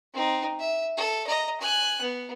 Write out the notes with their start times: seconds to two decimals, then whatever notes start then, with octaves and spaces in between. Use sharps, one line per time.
0.14 C4 D#4
0.59 E5
0.97 A4
1.27 D#5 A#5
1.60 G#5 F#6
2.01 B3